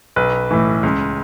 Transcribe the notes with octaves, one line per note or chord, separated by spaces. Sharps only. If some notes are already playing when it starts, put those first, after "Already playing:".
B1 B4
A2 E3
C#2